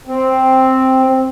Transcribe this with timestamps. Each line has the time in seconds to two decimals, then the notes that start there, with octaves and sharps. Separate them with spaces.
0.07 C4